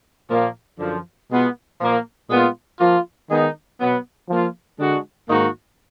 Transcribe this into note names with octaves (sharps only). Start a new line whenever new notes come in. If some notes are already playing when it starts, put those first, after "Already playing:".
A#2 F3 A#3
F#2 D3 F3
B2 G#3 B3 F4
A#2 F3 A#3
A#2 G#3 B3 F4
F3 A#3 F4
D#3 G#3 B3 D#4
B2 F#3 B3
F3 A#3 F4
D3 G#3 D4 F#4
G#2 D#3 A#3 D#4 F#4